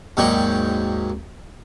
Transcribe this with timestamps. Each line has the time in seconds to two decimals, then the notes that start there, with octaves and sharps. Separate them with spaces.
0.17 D#2 G#2 F#3 D5 G5 C#6